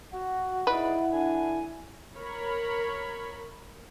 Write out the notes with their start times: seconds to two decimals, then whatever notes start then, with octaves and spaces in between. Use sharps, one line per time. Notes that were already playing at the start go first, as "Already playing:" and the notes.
0.14 F#4 F#5
0.67 D#4 E4 G#4 B4 D5
1.12 D3 D4 G#5
2.17 A#4 C#5 B5